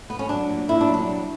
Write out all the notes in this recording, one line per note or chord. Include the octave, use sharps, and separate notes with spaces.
B3
C#4
F#3 D4
A#2
A#2 E4
D4
F#3
D4
G3